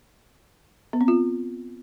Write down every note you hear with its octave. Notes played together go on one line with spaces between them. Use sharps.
B3
C4
F4